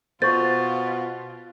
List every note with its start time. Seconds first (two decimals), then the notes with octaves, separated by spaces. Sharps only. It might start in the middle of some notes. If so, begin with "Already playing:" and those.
0.22 B2 F4 C5 C#6 A6